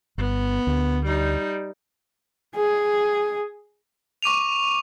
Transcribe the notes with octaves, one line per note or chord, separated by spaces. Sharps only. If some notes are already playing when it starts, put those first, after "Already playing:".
G1 B3
D2
G3 D#4
G#4
C#6 D6 D#7 F7